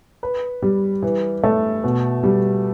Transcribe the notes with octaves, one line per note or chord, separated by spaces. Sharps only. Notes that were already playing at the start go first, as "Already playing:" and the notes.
B4
G3
E3
A3
B2
G3